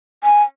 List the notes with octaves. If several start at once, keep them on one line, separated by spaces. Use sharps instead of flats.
G#5